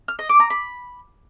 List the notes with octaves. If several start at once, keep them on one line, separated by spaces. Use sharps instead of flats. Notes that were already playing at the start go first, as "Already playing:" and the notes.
F6
D#5
D6
A#5
B5